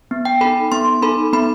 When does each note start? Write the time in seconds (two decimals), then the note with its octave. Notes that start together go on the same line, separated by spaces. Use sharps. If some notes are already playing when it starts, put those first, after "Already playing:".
0.11 B3
0.25 G5
0.41 D#4 A4 B5
0.72 B3 C6
1.02 D#4 A4 B5
1.33 B3 B5